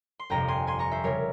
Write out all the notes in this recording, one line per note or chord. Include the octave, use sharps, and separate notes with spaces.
C6
G1 F2 C3 G5 A#5
G#5 C6
G#5 C6
A#5 C#6
C5 E5
C#3 G3 A#4 C#5